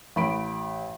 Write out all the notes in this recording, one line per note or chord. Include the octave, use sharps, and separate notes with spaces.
A1 B5 D7